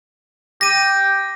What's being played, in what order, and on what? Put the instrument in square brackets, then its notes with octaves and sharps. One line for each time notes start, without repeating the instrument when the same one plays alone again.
[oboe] G4 [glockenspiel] A#6 D#7